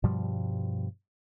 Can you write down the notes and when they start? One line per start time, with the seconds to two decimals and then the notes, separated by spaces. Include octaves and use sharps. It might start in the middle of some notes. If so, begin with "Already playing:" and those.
0.03 G2 B2 F3 G3